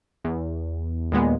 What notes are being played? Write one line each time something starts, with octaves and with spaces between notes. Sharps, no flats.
E2
D#2 A#2 G#3 B3